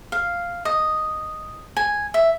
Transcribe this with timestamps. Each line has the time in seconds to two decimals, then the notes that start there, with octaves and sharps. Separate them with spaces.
0.12 F5
0.65 D#5
1.77 G#5
2.14 E5